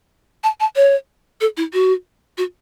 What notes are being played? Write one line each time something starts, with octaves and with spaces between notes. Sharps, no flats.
A5
A5
C#5
A4
E4
F#4
F#4